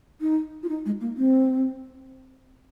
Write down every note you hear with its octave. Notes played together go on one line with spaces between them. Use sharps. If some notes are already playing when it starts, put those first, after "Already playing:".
D#4
F4
D#4
G#3
A#3
C4